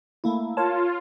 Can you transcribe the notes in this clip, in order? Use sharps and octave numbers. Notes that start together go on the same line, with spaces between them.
A3 A#3 E4
F4 A#4 C#5 A5